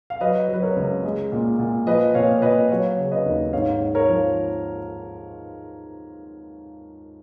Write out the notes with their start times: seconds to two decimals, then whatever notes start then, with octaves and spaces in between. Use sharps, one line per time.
0.10 F5
0.21 F#3 B4 D#5
0.49 F#3 B4
0.62 A#4 C#5
0.76 C#2
1.04 G#3
1.32 A#2
1.59 A#2
1.87 F3 B4 D#5
2.14 A#2 C#5 F5
2.42 A#2 B4 D#5
2.70 F#3 C#5 F5
2.98 C#3
3.11 B4 D#5
3.26 D#2
3.53 G#2 C#5 F5
3.81 G#2
3.95 A#4 C#5
4.09 F3